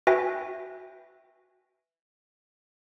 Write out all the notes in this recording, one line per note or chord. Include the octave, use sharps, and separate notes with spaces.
F#4 B4 E5 G5 G#5 A#6